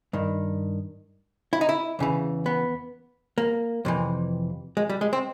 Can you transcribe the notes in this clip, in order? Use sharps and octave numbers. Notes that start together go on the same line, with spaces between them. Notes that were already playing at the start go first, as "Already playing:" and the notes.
G2 D#3
E4
D#4
E4
E2 C#3 E3
B3
A#3
F2 C3 E3
G#3
G3
G#3
C4